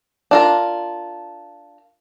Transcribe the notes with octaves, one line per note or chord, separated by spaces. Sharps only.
D4 F4 A#4